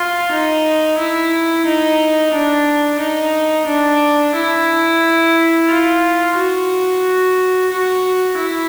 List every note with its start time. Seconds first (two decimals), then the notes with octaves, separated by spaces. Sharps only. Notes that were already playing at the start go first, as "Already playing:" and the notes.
Already playing: F4
0.31 D#4
0.98 E4
1.65 D#4
2.33 D4
2.99 D#4
3.67 D4
4.34 E4
5.68 F4
6.35 F#4
7.71 F#4
8.37 E4